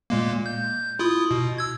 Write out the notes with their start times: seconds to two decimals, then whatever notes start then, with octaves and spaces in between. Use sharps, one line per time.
0.10 A#2 G#3 A#3
0.46 G6
0.99 E4 F4 D#6
1.31 B2
1.58 E6 G#6